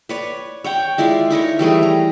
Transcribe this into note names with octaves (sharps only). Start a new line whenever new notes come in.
B4 C#5 D5
C#5 F#5 G5
G#3 E4 F4 D5
D#4 E4 A#4 C#5
E3 G3 A3 G#4
A#5